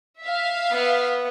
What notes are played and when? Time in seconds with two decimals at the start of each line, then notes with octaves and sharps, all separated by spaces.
0.22 E5 F5
0.71 B3